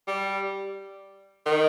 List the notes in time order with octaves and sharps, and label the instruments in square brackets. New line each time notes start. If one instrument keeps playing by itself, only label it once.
[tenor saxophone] G3
D#3